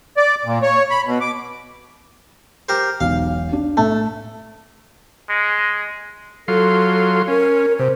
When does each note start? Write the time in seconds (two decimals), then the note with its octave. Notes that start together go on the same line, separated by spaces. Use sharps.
0.17 D5
0.45 A#2
0.62 C#5
0.91 B5
1.06 B2
1.21 D6
2.69 G4 A#4 C5
3.00 E1 B1 F5
3.53 D4
3.77 A2 A3 E5 A5
5.29 G#3
6.48 F#3 F4 A4 C6
7.28 C#4 A#4
7.79 C3 C5